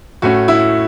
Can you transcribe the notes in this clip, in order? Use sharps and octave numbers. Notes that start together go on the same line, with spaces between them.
A2 A3 C#4 F#4
E4